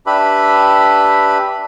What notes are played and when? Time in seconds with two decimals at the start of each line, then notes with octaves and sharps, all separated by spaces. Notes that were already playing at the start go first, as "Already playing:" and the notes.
0.06 D4 G4 B4 E5 B5